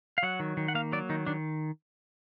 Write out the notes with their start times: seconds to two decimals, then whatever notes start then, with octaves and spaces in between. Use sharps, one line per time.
0.18 F5
0.23 F#3 F#5
0.40 D#3
0.57 D#3
0.68 F#5
0.75 A#3 F5
0.92 F#3 D5
1.09 D#3 D#4
1.26 D#3 D4